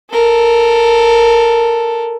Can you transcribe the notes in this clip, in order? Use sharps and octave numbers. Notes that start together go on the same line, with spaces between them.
A4 A#4